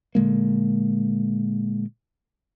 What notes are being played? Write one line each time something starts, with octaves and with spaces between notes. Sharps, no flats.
A#2 D3 G#3 A#3